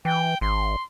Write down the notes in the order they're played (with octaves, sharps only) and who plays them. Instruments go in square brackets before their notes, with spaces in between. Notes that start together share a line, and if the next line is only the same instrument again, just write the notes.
[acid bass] E3 [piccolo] G5
[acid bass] G#1 [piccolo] C6